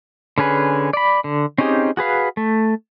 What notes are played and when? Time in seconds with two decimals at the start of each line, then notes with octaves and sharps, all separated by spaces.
0.38 D3 C#4 G#4 B4
0.93 D5 B5
1.24 D3
1.58 C4 C#4 D#4 G4 G#4
1.97 F#4 G#4 B4 F5
2.37 A3